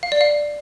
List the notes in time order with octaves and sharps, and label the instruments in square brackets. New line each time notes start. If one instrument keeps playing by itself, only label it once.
[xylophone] F5
D5
F5